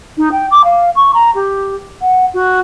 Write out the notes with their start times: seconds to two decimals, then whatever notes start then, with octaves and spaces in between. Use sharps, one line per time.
0.17 D#4
0.31 G5
0.51 D6
0.64 F5
0.95 C#6
1.14 A#5
1.35 G4
2.01 F#5
2.33 F#4